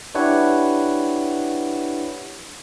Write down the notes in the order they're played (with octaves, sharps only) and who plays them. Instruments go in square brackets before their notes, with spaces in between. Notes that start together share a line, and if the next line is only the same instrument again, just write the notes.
[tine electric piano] D4 E4 G4 B4 C#5 F#5